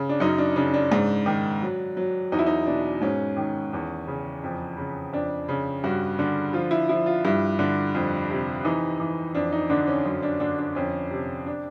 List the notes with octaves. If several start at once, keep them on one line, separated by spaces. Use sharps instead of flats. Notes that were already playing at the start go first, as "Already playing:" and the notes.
Already playing: C#3
D4
F#2 D#4
D4
C#3 D4
D4
G#2
D#3
F#3
F#3
E2 D#4
E4
D#4
B2 D4
G#2 C#4
D#3
E2
C#3
F2
C#3
F2 D4
C#3
G2 F#4
D3
F3 F4
E4
F3 E4
F4
G2 E4
D3
F2
C3
E3 D#4
E3
F2 D4
D#4
D3 D4
C#4
F#2 C#4
D4
D3 D4
D4
F2 C#4
C3
D4